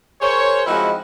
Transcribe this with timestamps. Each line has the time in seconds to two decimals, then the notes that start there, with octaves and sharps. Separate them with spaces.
0.21 G#4 A#4 C5 C#5
0.66 F3 G#3 C4 D#4 E4 F#4